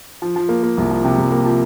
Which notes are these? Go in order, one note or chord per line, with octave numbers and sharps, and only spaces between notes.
F3
F3
A#3
A#3
C2
F3
C3
C2
A#3
F3